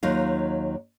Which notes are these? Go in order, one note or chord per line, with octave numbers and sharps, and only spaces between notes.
D#2 F#3 D#4 F4